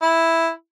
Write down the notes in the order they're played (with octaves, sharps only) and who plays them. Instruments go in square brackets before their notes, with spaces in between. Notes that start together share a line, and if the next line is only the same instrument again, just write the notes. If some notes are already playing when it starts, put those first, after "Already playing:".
[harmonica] E4